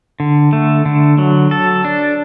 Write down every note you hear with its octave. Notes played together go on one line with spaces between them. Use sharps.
D3
A3
D3
F#3
A4
D4